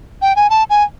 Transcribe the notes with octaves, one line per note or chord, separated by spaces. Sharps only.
G5
G#5
A5
G#5